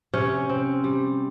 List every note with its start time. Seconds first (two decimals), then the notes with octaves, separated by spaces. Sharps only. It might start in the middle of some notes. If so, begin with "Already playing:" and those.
0.14 C3 C#4
0.49 C4
0.84 G3